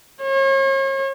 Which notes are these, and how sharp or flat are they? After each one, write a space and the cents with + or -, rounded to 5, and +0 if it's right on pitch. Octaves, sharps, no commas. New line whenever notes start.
C#5 -40